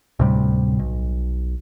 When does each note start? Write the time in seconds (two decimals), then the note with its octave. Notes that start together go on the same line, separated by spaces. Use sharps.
0.19 D2 A2 C3 G3
0.79 B1